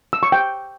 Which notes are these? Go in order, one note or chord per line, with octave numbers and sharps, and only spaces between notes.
E6
C#6
G5